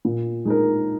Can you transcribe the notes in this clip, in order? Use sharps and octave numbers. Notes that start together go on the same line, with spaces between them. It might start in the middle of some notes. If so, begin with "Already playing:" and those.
A#2
G#3 D#4 A#4